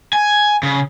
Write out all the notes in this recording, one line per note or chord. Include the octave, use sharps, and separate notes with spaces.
G#5
C#3